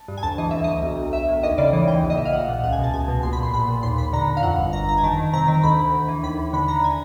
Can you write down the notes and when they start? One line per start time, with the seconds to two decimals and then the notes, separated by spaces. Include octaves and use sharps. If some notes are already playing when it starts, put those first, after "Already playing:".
Already playing: A5
0.08 G2
0.17 G#5
0.23 D2 A5
0.38 E3 D#5
0.51 D2 E5
0.64 D2 D#5
0.83 B1
0.98 B1
1.13 B1 E5
1.28 A2
1.43 D#2 D#5
1.58 C#3 D5
1.73 E3 D#5
1.88 D#2 G5
2.03 A#1
2.10 D#5
2.17 A#1 E5
2.25 F5
2.33 A#1 F#5
2.48 A#2
2.63 C#2 F#5
2.73 G#5
2.78 B2
2.84 A5
2.94 C#2 G#5
3.08 B2
3.23 A#1 C6
3.33 B5
3.38 A#2 C6
3.54 A#1 B5
3.68 A#2
3.83 D#2 C6
3.98 D#2 B5
4.13 D3 A#5
4.28 D3
4.37 F5
4.43 F2 F#5
4.59 G1
4.73 G1 A#5
4.88 G1 A#5
4.98 G#5
5.03 D#3 A5
5.18 D#3
5.33 C3 A#5
5.48 D#3
5.63 D2 B5
5.79 D2
5.94 D2
6.09 E3
6.23 D#2 B5
6.38 D#2
6.53 D3 B5
6.68 D3 A#5
6.84 G#5